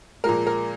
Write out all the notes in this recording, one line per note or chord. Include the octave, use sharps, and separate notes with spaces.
A#2 F3 G#3 A#4
A#4